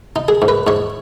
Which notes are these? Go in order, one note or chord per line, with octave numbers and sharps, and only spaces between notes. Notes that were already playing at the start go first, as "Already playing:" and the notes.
D#4
G#4
G#2
B4
G#2 C#5